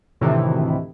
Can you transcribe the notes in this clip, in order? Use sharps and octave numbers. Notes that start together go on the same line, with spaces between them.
D2 A2 C3 D#3 E3 A3